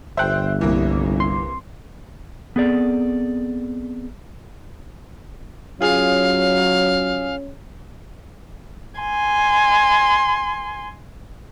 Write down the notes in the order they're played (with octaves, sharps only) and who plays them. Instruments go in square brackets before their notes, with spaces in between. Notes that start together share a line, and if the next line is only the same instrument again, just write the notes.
[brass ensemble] G1 [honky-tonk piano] C5 G5 [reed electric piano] E5 F#6
[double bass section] C2 [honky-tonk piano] E3 A#3
[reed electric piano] C6
[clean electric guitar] B3 C4 G#4 A4 D5
[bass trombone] F#3 [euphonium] C#4 [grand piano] F4 G#4 [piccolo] F5
[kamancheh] G#5 C6